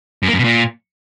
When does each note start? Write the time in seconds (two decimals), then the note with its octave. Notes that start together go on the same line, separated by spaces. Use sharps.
0.23 F#2
0.28 A#3
0.33 F#2
0.39 B2
0.44 A#2